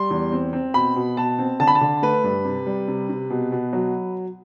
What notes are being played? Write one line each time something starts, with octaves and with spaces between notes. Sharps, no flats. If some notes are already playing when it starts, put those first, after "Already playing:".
Already playing: G3 C6
E2
C4
C4
B2 B5
B2
B2 A5
C4
D3 A5
B5
A5
D3
A3 B4
G2
C3
G3
C3
C3
B2
B2
F#3